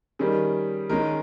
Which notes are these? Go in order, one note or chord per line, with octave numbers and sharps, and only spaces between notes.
D#3 G3 C#4 G#4
D#3 G#3 C#4 A#4